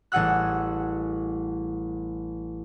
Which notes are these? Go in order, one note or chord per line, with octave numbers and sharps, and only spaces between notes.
A1 G3 G#4 F#5 E6 F#6